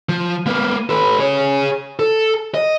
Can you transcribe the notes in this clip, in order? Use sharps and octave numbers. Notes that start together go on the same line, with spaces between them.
F3
A#3 B3
A4 B4
G#4 C#5
A4
D#5